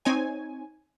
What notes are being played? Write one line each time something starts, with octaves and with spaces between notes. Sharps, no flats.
C4 D#4 C#5 G#5